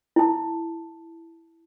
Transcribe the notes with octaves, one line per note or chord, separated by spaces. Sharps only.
E4 A5